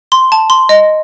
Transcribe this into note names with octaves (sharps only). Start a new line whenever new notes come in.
C6
A5
C6
D#5